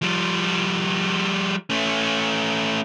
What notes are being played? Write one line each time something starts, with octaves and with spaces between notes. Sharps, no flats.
F3 G3
A3 C#4